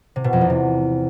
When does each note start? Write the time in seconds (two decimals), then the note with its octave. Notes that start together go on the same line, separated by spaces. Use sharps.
0.16 C3
0.24 B2
0.33 F2
0.41 E2
0.50 C3